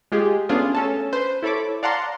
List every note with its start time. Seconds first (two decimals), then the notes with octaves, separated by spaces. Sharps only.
0.12 G#3 F4 G4 G#4
0.49 A3 B3 C#4 D4 F4 G#4
0.75 C#4 A4 A5
1.13 B4 C5
1.43 E4 A4 C#5 B5 D6
1.83 D5 F5 F#5 A5 A#5 C6